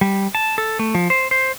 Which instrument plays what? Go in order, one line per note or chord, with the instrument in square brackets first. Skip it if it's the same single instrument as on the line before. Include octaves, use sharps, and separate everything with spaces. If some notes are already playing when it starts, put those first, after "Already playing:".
[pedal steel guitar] G3
A5
A4
A3
F3
C5
C5